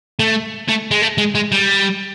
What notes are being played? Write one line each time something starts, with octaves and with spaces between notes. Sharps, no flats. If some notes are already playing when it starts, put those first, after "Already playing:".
A3
A3
G#3
A3
G#3
G#3
G3